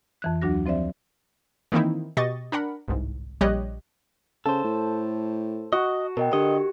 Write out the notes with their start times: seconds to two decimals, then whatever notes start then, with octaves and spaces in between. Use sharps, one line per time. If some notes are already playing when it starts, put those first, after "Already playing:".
0.22 F2 E3 F#6
0.42 D2 F#3 D4 F#4 A#6
0.66 F3 C4 C5 D5 E5
1.72 D#3 E3 A#3 C4 D#4 E4
2.17 B2 G4 D#5 C#6 A6
2.52 D4 A#4 F#5 B5
2.88 G1 C2 G#2
3.41 A#1 G3 G4 C#5 D#5 F#6
4.46 C#3 A4 C5 A5
4.64 A2
5.73 F#4 D#5
6.17 B2 A#4 D#5 G5
6.33 D3 G4 D#5